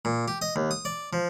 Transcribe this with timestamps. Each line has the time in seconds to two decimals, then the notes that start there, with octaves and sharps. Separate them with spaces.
0.05 A#2
0.28 G4
0.42 D#5
0.56 D#2
0.71 D#6
0.85 D5
1.13 F3